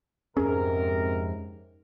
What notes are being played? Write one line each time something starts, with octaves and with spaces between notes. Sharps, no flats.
F2 G#2 C3 C#4 G#4 A#4